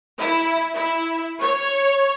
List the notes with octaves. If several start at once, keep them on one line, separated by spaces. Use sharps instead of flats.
E4
E4
C#5